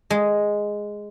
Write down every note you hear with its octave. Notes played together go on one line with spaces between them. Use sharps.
G#3